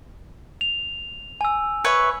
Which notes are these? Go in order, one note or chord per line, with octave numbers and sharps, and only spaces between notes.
F7
G#5 E6
B4 C#5 E5